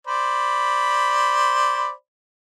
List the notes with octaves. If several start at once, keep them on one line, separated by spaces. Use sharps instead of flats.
C5 D5 B5